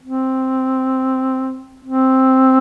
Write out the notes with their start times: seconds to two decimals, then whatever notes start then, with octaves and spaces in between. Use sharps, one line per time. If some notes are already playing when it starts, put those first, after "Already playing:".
0.03 C4
1.85 C4